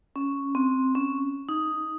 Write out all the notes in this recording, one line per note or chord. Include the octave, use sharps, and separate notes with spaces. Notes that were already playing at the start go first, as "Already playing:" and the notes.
C#4
C4
C#4
D#4